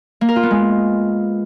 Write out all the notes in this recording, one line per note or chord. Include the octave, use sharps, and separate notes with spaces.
A#3
A#4
F4
B3
G#3